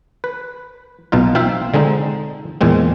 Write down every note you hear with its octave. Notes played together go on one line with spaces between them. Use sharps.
B4
B1 B2 D#4 F4
C4 F4 C5 E5
D3 G#3 C4 D#4
E2 A#2 G#3 C4